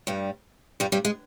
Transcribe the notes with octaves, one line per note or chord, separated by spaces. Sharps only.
G2 G3
G2 G3
G2 G3
G#3